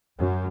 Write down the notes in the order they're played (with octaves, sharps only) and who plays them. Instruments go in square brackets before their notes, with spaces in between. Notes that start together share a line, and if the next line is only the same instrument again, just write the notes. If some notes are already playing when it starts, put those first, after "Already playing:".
[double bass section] F#2